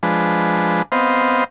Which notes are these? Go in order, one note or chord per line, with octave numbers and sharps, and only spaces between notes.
F3 G#3 D4 B4
B3 C4 C5 D#5 F5